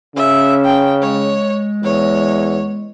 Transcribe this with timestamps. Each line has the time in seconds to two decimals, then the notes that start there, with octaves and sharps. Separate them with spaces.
0.16 C#3 C#4 E5
0.64 G5
1.02 G#3 C#5
1.84 E2 C#5